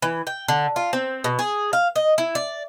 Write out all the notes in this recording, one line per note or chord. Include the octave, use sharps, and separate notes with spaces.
E3
G5
D3
F4
C4
B2
G#4
F5
D#5
E4
D5